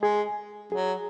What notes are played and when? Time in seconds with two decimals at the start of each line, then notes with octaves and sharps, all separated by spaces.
0.02 G#3 G#4
0.72 F#3 G#4